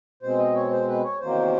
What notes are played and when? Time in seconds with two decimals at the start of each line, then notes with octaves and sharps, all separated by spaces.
0.23 B2 G#3 C4 C5
0.38 D#5
0.55 C#5
0.71 C5
0.88 B4
1.04 C#5
1.20 E2 C3 D#3 F#3 A#3 C5